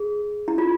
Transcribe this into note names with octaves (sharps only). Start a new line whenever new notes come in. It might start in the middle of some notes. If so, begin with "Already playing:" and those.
Already playing: G#4
E4
F4